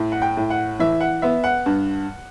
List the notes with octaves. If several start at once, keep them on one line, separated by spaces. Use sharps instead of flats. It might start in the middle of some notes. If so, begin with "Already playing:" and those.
Already playing: A2
F#5
G5
A2
F#5
E3 E5
F#5
B3 E5
F#5
G2